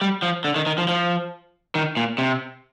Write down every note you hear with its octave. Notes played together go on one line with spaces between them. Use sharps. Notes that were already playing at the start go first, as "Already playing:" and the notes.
G3
F3
D3
D#3
D#3
F3
F3
D#3
A#2
C3